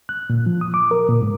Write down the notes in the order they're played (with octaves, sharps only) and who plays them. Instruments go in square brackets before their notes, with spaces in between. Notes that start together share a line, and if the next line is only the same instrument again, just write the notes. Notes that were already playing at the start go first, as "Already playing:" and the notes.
[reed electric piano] F#6
A#2
F3
D#6
D6
A#4
A#2
G#2